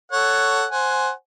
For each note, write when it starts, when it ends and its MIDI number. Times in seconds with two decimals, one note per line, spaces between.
0.12 0.65 69
0.12 0.65 73
0.12 0.65 78
0.71 1.10 72
0.71 1.10 78
0.71 1.10 80